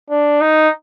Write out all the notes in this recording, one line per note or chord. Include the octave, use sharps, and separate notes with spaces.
D4
D#4